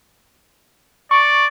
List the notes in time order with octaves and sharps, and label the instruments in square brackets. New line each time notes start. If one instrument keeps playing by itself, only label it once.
[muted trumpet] D5 [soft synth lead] C#6